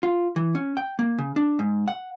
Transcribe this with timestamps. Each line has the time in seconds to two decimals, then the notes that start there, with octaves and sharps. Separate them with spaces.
0.03 F4
0.36 E3
0.55 C#4
0.77 G5
0.99 A#3
1.18 C#3
1.36 D4
1.59 G#2
1.88 F#5